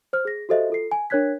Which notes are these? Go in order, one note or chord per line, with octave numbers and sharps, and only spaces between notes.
C5 F6
G#4 A#6
F#4 G4 A4 C5 D#5 E5
F4 A4 C7
G#5
D4 A#4 C#5 F#6 G#6 B6